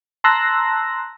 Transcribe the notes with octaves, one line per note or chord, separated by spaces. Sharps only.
A5 A#5 C6 E6 F#6 A#6